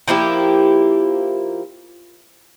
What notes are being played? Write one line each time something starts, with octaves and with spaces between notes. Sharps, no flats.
F3 A#3 E4 G4